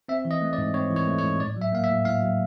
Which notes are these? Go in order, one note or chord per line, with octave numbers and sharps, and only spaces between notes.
C4 E5
E3
D#5
A3
D5
G#2
C4 C#5
E3
C#5
A3
C#5
G#2
A2 D5
F#3
E5
A#3 F5
E5
A2
A2 F5
F#3